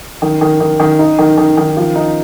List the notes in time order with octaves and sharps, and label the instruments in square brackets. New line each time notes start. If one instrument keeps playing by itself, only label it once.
[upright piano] D#3
D#3
D#3
D#3
D#4
D#3
D#3
D#3
F3
D#4